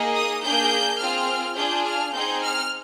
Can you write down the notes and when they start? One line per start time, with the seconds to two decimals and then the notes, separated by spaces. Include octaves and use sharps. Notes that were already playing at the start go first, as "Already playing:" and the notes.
Already playing: A#3 D#4 G#4
0.15 D#6
0.43 A#3 D4 G#4 G6
1.00 C4 F4 G#4 F6
1.56 D4 F4 G#4 G6
1.85 F6
2.12 C4 D#4 G#4 G6
2.42 F6